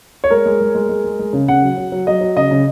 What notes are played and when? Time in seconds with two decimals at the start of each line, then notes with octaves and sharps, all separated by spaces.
0.24 C#5
0.30 G#3 A#4
0.46 G#3
0.60 G#3
0.75 G#3
0.89 G#3
1.04 G#3
1.19 G#3
1.33 C#3
1.48 C#3 F#5
1.62 F#3
1.77 F#3
1.92 F#3
2.07 F#3 D#5
2.21 F#3
2.37 C#3 D#5
2.51 C#3